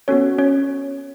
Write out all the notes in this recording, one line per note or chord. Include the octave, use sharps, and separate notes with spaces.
B3 C#4 F#4 A4 C#5
C#4 C#5